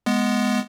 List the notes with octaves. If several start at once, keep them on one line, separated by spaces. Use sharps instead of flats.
G#3 B3